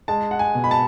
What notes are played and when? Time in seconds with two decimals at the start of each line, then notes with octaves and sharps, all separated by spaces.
0.08 G#3 A5
0.31 F#5
0.39 G#5
0.55 B2
0.64 B5
0.71 A5